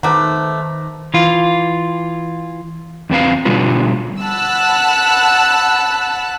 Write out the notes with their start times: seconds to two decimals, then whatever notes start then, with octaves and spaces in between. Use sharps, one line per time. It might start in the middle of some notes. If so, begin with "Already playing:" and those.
0.03 D#3 A3 F#4 B4 C5 A#5 D6
1.14 E3 F4
3.10 E2 C4 B4 F5
3.45 B2 D3 G3 F4 B4
4.23 F#5 A5 B5 E6 F#6